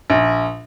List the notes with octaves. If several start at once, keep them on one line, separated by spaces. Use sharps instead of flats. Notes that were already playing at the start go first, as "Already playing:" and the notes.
A#1